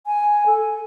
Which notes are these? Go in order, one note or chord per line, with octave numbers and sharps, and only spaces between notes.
G#5
A4